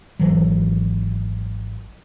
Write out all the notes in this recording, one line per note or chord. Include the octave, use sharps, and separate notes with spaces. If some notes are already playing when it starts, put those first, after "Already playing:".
G#1 E3 F#3